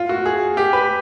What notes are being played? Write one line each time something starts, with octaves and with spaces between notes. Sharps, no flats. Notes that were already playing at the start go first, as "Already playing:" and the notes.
Already playing: F4
F#4
G#4
G4
B4